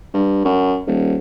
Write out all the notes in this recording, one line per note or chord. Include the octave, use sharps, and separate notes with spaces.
G2
F#2
D#1